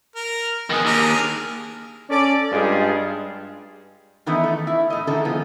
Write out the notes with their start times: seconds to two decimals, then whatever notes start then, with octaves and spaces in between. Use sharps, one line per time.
0.15 A#4
0.70 D#3 B3 G#4
0.85 D#2 D4 G#4 A#4
2.10 C#4 A4 D5
2.52 G2 G#3 D#4 F4 G#4
4.26 D#3 E3 A3 B3 D#4 E4
4.44 A3
4.67 E4
4.90 A2 D#5
5.07 D3 D#3 E4 G#4 A4
5.25 F3 G#3 B3